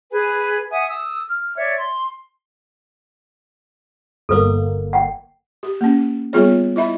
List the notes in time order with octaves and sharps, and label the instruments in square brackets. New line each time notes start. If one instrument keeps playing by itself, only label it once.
[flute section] G#4 B4 G#5
E5 F#5 G#5 D#6
D#6 E6
F6
C#5 D5 E5
C6
[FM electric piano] G1 A#3 [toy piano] A4 B4
[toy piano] F#5 G5
[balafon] G4
A#3 C#4
G3 B3 F4 G#4 C#5
E4 D#5 E5 B5